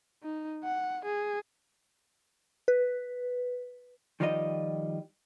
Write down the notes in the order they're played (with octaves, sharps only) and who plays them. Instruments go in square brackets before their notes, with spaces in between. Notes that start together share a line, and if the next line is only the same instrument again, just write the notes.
[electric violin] D#4
F#5
G#4
[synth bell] B4
[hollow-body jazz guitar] D#3 F3 G3 F4 A#4 D#5